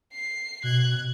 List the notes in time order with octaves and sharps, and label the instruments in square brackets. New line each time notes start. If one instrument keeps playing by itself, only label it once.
[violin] C7
[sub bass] B2 [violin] F#6 G#6